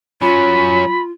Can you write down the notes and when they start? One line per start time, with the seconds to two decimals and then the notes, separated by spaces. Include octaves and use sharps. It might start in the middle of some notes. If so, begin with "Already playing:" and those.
0.22 F#3 C#4 F4 B5